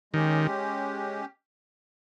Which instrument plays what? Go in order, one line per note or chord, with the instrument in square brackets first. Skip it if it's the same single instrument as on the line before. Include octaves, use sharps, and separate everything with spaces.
[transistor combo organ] D#3 [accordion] G#3 C#4 G4